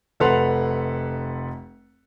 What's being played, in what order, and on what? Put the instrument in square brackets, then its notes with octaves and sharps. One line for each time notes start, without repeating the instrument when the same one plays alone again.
[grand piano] F1 A4 B4 F#5 C6 F7